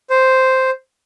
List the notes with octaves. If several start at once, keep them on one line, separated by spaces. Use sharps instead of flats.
C5